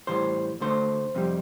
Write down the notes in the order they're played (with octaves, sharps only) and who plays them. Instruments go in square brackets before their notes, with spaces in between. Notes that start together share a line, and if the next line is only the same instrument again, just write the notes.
[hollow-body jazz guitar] A2 E3 G3 C5
D2 D3 A3 C5
F2 C3 G3